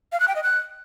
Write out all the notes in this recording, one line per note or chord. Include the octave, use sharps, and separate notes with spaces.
F5
F#6
G5
D#5
F#6